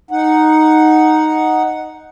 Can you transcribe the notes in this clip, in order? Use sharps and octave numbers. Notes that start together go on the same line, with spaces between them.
D#4 F#5